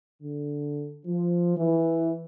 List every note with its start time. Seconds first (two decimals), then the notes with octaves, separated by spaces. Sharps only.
0.21 D3
1.05 F3
1.57 E3